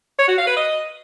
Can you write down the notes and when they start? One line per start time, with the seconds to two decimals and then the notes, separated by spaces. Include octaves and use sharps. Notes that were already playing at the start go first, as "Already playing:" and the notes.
0.19 C#5
0.28 F#4
0.38 F5
0.47 B4
0.57 D#5